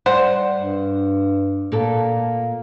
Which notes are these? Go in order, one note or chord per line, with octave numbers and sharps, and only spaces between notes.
G3 C5 F#5
G2
A#2 A#3 A4